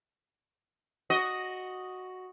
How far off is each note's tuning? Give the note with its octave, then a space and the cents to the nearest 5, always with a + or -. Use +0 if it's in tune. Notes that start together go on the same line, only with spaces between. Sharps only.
F#4 +0 D#5 +0